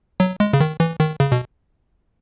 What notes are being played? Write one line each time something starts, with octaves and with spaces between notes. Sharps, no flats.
F#3
G#3
C#3
D#3
E3
D#3
C#3
B2